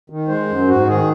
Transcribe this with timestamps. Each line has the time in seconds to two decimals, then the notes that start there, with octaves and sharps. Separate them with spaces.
0.10 D#3
0.28 G#3 C5
0.48 F#2
0.67 G#2 F#4
0.88 D#3 G#4